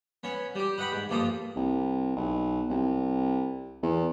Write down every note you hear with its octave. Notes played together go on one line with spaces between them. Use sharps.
B3 C#4 C#5
G3 G4
B4 D#5 F#5 G5 B5
G#2
G2 A#2 F3 F4 A4 D#6
C2
B1
C2
E2